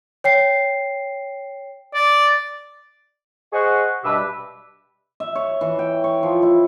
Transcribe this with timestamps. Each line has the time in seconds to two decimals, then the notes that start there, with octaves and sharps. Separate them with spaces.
0.24 C#5 G5 C7
1.94 D5
3.53 G#4 C5 D#5 F#5 C#6
4.04 G2 B2 G3 G4 B4 E5
5.20 E5
5.35 C#5
5.61 E3
5.79 G5
6.04 C#5
6.23 F3
6.42 E4